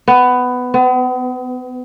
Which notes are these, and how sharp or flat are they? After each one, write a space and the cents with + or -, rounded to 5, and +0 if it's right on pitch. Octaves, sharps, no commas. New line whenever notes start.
B3 +15
B3 +40